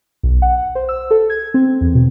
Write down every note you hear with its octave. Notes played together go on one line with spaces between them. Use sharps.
B1
F#5
C5
E6
A4
G#6
C4
E2
B2